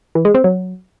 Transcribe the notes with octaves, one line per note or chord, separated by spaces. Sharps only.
E3
G#3
C4
F#3